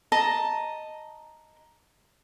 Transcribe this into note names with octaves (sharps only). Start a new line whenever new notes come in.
D#5 A5 A#5